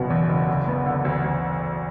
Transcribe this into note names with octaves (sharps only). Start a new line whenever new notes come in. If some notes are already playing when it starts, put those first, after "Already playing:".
Already playing: F#1 E2 B2 B3
E2
F#1
D2
B3
D3
D2
D2